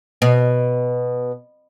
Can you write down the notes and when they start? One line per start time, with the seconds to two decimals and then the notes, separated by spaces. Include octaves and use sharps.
0.22 B2